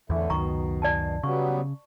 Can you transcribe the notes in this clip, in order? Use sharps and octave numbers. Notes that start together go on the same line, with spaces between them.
E2 A2 D3 E3 A3
C#2 F#2 B2 D#3 A#5 C#6
D5 G#5 A5
C#3 F#3 G3 B3 C#6